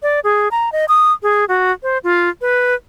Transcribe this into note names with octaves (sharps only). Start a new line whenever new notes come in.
D5
G#4
A#5
D#5
D#6
G#4
F#4
C5
F4
B4